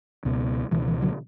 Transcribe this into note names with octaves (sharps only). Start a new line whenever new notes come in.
C#2 B2
C#2 B2 E3
E3
D3 F#3